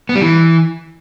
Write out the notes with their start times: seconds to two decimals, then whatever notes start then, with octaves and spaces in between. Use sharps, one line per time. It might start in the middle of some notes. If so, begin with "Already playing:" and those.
0.09 B3
0.15 G3
0.21 E3